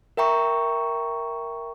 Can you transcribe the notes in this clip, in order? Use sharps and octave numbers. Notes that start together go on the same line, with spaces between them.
A#4 E5 G5 A#5 C#6